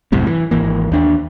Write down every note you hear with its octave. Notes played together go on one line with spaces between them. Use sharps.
C2 F#2 A2 C3
E3
G#1 E3 A#3
D#2 D4